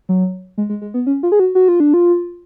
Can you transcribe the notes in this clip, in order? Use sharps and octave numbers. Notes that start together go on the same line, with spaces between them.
F#3
G#3
G#3
G#3
B3
C#4
F4
G#4
F#4
F#4
F4
D4
F4